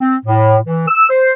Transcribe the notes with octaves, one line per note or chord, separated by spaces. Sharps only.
C4
A2
E3
E6
C5